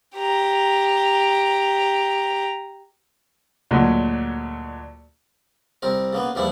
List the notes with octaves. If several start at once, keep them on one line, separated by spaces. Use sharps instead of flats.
G4 A#5
D2 A#2 F#3 G#3
C2 C4 A#4
C#3 A#3 B3
E2 A#2 F3 G3 D4 E4